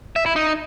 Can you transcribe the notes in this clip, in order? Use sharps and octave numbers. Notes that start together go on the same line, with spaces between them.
E5
E4
D#4